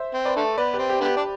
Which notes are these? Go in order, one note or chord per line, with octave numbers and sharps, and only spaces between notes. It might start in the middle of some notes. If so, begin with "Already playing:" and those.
Already playing: C5 E5
C4
B4 D5
D3 A3
B3 B4 D5
C4 G4 B4
G4
D3 B3 G4
D4